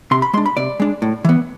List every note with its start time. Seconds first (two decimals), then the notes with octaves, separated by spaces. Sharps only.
0.11 C3 C6
0.22 B5
0.34 G#3 C6
0.37 D4
0.46 B5
0.57 C3 D5
0.80 G#3 D4
1.02 A2
1.25 E3 B3